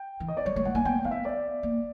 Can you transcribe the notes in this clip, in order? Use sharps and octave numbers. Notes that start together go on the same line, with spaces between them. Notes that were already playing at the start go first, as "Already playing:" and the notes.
Already playing: G5
E3
D#5
D5
G3 C#5
A3 C#5
G#3 F#5
A#3 G#5
B3 G5
B3 F5
E5
D5
A#3